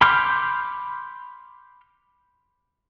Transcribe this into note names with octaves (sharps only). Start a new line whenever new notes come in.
B5 C6 D6 F6 G6